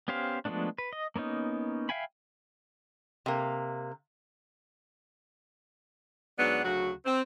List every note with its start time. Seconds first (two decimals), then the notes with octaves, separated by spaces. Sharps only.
0.08 B3 C#4 G4 C5 F5
0.45 F3 G#3 A3 B3 D4
0.78 B4
0.93 D#5
1.16 A#3 B3 C#4 D#4
1.89 E5 F5 G5 G#5 B5
3.26 C3 A#3
6.38 G#2 F#3 B3 D4
6.64 D2 C#3 F#3 F#4
7.06 C4